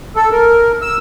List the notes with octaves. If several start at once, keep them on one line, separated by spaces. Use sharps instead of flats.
A4
A#4
E6